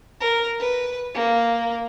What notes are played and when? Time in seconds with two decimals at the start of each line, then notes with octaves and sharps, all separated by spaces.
0.21 A#4
0.59 B4
1.15 A#3